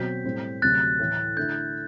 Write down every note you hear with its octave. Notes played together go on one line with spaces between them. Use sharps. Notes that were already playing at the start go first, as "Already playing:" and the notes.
Already playing: B2 F#3 C4 F#4 G6 B6
A2 G3 C4
D2 C3 F#3 F#6 A6
A2 E3 A3
D3 A3 E4 G6